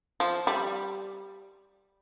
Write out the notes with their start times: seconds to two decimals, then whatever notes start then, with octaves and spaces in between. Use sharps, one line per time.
0.20 F3
0.47 G3